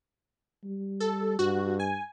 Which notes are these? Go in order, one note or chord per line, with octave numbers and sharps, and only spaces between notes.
G3
A4
G2 F#4
G#5